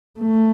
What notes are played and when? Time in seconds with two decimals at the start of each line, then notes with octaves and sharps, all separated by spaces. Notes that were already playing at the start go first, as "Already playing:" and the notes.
0.20 A3